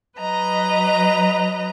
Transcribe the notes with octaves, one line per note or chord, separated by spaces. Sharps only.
F#3 B4 D#5 A#5